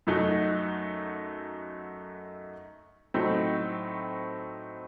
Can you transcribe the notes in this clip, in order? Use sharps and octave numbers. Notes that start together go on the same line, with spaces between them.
F#2 F#3 A3 D#4 F#4
A2 F#3 A3 C4 D#4